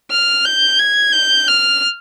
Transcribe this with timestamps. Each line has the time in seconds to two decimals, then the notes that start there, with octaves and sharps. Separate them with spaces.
0.11 F6
0.45 G6
0.79 G#6
1.13 G6
1.48 F6